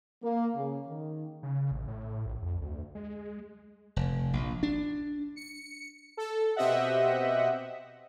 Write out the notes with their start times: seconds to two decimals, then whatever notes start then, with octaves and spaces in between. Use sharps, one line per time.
0.22 A#3
0.55 C#3
0.86 D#3
1.43 C#3
1.72 A1
1.88 A2
2.26 A#1
2.42 F2
2.62 D2
2.95 G#3
3.10 G#3
3.96 F1
4.33 A#1
4.63 D4
5.36 C#7
6.17 A4
6.56 B2 C4 G4 D#5 E5 F#5